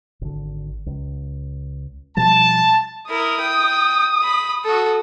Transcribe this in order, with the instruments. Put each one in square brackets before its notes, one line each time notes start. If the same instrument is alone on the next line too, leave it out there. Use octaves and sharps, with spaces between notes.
[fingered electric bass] G#1 D3
C#2
[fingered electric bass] B2 F3 G3 [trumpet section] A5
[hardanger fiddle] E4 A#4 [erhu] D#6
[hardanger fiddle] G5
B5
F#4 A4